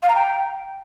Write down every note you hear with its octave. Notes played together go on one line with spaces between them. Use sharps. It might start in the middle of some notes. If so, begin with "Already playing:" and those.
F5
A#5
G5